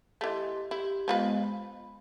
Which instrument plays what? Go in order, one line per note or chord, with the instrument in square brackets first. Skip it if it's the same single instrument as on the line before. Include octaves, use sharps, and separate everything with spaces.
[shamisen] E3 A3 [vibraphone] G4 D#5 C6
[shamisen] E4 [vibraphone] G4
[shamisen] F3 F4 B4 [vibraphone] G#3 B3 D#5
[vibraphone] B5